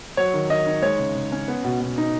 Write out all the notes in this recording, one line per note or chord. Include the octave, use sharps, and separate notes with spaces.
F#3 C#5
D#3
D#3 D#5
D#4
G#3 C#5
C#3
C#3
C#4
B3
B2
B2
D#4